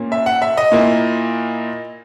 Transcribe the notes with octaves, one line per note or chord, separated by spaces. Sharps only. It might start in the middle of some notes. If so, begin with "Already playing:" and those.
Already playing: A#2 A#3 C#4
E5
F#5
E5
D#5
A#2 A#3 E4